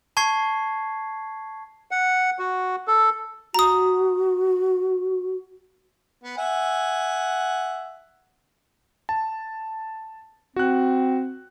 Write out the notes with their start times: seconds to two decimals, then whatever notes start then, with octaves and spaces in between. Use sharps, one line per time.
0.17 A5 C#6 G#6 C7
1.91 F#5
2.39 F#4
2.88 A4
3.54 F#4 A#5 D#6
6.24 B3
6.37 E5 F#5 G#5
9.09 A5
10.56 C4 F#4 F#6